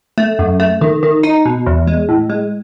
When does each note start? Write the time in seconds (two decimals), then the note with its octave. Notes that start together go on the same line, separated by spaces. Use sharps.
0.18 A3
0.39 F#2
0.60 A3
0.81 D#3
1.03 D#3
1.23 D#4
1.46 B2
1.66 E2
1.87 G#3
2.09 A2
2.30 G#3